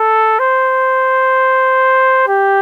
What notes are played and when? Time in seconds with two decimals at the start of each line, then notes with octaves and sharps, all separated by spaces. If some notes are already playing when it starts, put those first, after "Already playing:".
Already playing: A4
0.39 C5
2.28 G4